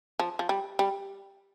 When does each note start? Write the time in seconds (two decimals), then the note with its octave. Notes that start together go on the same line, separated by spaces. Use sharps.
0.19 F3
0.39 F3
0.49 G3
0.79 G3